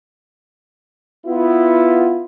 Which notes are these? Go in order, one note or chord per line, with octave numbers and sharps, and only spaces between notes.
B3 E4 F4